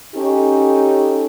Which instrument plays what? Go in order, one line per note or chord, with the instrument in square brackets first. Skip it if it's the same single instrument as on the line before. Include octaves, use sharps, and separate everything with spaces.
[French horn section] C#4 D#4 G4 A4